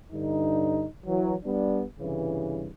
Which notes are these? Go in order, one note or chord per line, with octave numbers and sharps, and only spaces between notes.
G2 D3 D#4
E3 F#3
G3 B3 D4
C2 G2 C#3 E3